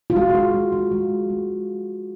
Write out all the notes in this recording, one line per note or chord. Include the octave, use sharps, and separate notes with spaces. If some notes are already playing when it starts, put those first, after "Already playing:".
F4
G#3 F#4
F#4
F4
G#3
F4
G#3
G#3